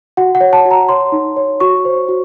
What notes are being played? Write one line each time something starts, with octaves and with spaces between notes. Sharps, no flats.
F#4 F#5
F#5
C#5
A5
F#4
A#5
C#5 C6
D#4
C#5
F#4 C#6
C5
F#4